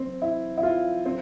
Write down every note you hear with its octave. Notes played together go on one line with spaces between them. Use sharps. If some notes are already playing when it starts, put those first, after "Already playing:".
Already playing: C4
E4
E4
F4
C4